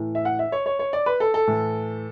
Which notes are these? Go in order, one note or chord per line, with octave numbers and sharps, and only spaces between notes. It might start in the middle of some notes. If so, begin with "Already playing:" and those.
Already playing: A2 E3
E5
F#5
E5
C#5
C#5
C#5
D5
B4
A4
A4
A2 E3